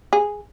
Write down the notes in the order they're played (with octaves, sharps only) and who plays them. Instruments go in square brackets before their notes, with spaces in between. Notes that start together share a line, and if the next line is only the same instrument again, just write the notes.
[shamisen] G#4